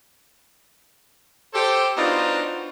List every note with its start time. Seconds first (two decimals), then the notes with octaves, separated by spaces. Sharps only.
1.54 G4 A4 C5
1.97 B3 D4 D#4 F4 F#4 C5